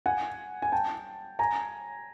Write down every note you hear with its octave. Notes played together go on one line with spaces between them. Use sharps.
F#5 G#5
G#5
G5 A5
G#5 A#5